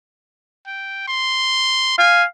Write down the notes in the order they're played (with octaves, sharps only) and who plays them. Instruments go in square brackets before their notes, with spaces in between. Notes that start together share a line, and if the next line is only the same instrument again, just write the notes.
[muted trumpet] G5
C6
[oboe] F5 [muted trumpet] G#5